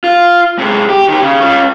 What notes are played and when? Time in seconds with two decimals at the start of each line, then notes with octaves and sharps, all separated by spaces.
0.04 F4
0.59 C3 G#3
0.89 G4
1.08 D#3 G4
1.22 C#3
1.41 C#4 F4